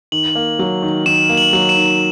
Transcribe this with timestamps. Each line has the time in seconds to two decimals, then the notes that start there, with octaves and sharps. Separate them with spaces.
0.12 D#3 F#7
0.35 A#3
0.59 F#3
0.82 D#3
1.06 D#3 E7
1.29 A#3
1.37 F#7
1.53 F#3
1.69 E7
1.76 D#3